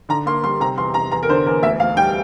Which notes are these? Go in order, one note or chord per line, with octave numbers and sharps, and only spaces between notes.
D3 A#5
A#3 C6
G3 C6
C3 A#5
E2 C6
C3 A#5
E2 A#5
A#4
D3 C5
E2 A#4
D2 E5
D2 F5
G3 G5